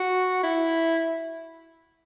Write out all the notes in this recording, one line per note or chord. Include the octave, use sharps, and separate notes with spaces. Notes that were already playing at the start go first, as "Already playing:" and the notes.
Already playing: F#4
E4